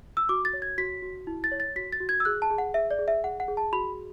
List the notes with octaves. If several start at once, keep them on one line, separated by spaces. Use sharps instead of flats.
E6
F#4 D6
A6
C#5
G#6
F#4 B6
F#4
E4
A6
C#5
A6
F#4 B6
A6
F#4
G#6
E6
G#4 F#6
A5
G#4
F#5
G#4 E5
D5
G#4
E5
G#4 F#5
F#5
G#4
A5
F#4 B5